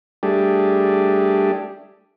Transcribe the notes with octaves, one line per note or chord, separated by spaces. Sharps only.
G3 A3 D4 G4 G#4